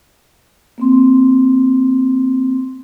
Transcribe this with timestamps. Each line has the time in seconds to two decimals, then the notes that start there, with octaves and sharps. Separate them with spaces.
0.78 A#3 C4 C6